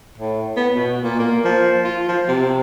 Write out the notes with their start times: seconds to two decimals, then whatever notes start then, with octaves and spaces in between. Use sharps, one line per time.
0.18 A2
0.57 B3
0.74 B2
1.03 A#2
1.19 A#3
1.45 F3
1.85 F4
2.09 F3
2.28 C3